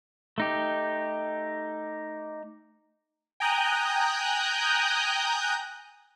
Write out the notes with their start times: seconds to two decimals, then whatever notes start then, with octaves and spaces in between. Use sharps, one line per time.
0.38 A3 D#4 G4
3.40 G5 G#5 A#5 D#6 F#6 G6